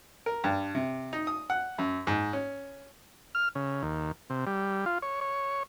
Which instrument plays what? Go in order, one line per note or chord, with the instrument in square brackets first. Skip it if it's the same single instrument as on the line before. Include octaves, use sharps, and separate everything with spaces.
[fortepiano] A#4
G2
C3
D#4
D#6
F#5
F#2
G#2
C#4
[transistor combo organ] F6
C#3
D#2
C3
G3
F4
C#5
C#5